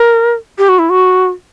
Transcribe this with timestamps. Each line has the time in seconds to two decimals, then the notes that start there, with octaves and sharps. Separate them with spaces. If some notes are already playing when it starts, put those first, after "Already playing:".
Already playing: A#4
0.58 G4
0.69 F#4
0.79 E4
0.90 F#4